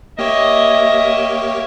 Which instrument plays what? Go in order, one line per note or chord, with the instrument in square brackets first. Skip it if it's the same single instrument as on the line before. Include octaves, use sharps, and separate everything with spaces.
[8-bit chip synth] A#3 G4 C#5 [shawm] D#5 [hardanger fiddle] E5